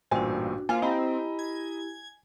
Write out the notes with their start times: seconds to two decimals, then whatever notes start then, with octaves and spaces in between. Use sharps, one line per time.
0.11 A1 G2 A#2 D4 F#4 C5 G5 G#5
0.69 A#3 F4 C5 F5 G#5
0.82 C4 E4 G4 D#5 A#5 B5
1.39 G#6